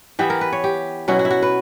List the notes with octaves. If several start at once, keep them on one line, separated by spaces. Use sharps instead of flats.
E3 B3 E4 G4
A#4
B4
C#5
G4
B2 F#3 C#4 E4 F#4
F#4
E4
F#4
B4